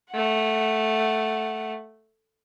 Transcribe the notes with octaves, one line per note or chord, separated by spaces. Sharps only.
A3 F#5